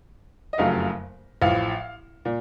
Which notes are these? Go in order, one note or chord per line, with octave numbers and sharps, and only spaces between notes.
D#5
F#1 F2 C#3 F#3 A3 F5
A1 A2 F3 F5
A#2